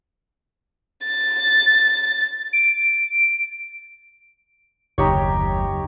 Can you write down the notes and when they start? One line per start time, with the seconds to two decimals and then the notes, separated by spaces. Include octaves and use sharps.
1.06 A6
2.53 D7
4.98 F#1 D#2 D#4 G4 C#5